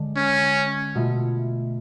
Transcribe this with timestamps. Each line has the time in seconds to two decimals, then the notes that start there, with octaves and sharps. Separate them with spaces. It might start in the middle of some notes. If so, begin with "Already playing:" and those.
Already playing: D3 G#3
0.16 C#4
0.95 B2 A3 F4